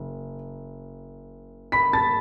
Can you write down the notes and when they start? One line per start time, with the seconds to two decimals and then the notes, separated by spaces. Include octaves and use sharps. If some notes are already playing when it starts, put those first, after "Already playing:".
Already playing: F#1
1.72 B5 B6
1.93 A5 A6